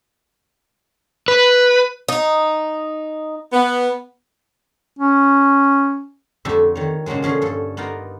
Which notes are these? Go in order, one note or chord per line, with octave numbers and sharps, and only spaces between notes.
B4
D#4
B3
C#4
F2 D3 A3 G4 E5 A5
D#3 C#5
A#2 C#3 F3 F#3 G#3
D3 F3 C#4 G#4
G2 A4
B3 D#4 F4 A#4 D5